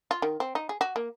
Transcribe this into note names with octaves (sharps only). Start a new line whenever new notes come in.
F4
D#3
C4
D#4
G#4
F#4
A#3